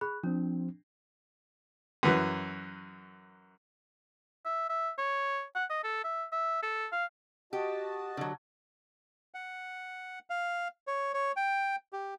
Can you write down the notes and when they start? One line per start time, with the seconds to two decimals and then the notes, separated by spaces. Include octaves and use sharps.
0.01 G#4 B5 F#6
0.24 F3 C4 D4
2.03 F#2 E3 F#3
4.45 E5
4.69 E5
4.98 C#5
5.55 F#5
5.70 D#5
5.84 A4
6.04 E5
6.32 E5
6.63 A4
6.92 F5
7.53 F#4 G4 D#5 A5
8.17 D3 F#3
9.34 F#5
10.30 F5
10.87 C#5
11.14 C#5
11.36 G5
11.93 G4